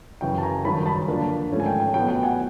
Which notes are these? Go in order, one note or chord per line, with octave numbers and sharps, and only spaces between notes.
F#2 C#3 E3 G5
A5
G#5 A#5
G2 D#3 F#3 A5 B5
A5 B5
D3 F3 A#3 D4
G#2 F3 A3 C#4
G#5
G5
G5
A2 F#3 B3 G5
G5
F#5 G#5